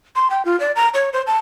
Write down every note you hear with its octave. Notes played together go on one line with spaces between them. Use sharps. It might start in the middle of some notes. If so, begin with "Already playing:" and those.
C6
G5
F4
D5
A#5
C#5
C5
A5